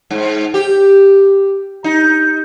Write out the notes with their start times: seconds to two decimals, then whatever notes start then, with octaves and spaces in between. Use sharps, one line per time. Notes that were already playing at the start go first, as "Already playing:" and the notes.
0.10 G#2
0.54 G4
1.84 D#4